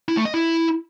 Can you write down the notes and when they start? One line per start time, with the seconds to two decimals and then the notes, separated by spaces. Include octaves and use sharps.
0.08 E4
0.17 A3
0.25 D#5
0.34 E4